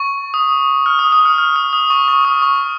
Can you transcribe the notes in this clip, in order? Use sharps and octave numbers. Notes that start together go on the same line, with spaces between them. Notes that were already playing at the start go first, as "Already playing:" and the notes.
Already playing: C#6
D#6
F6
D#6
D#6
F6
F6
D#6
D#6
C#6
C#6
D#6
C#6